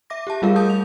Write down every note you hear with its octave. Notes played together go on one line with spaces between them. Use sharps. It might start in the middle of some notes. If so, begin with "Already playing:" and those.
E5 D6 A#6
G4 E5 A5
G3 A3 F4 G#4 A#4 F5
G#4 A5 D#6 G6
F7